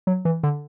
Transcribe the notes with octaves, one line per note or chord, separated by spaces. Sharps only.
F#3
E3
D3